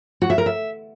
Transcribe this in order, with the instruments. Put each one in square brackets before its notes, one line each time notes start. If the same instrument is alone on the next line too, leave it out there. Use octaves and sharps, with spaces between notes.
[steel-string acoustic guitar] F#4
E5
A#4
E5